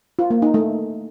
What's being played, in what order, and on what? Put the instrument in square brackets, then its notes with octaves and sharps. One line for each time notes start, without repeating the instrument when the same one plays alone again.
[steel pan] F4
A#3
D#4
A3